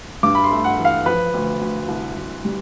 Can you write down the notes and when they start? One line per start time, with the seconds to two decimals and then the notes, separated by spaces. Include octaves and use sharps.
0.23 G2 D6
0.35 B5
0.44 C6
0.51 A3
0.64 F#5
0.79 E3
0.85 F5
1.05 F3 B4
1.34 D2
1.61 D2
1.88 C2
2.16 C2
2.45 G3